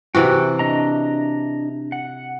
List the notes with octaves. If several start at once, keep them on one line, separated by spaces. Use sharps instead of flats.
C3 E3 F#4 G4 G5
D4 D#5 A#5
F#5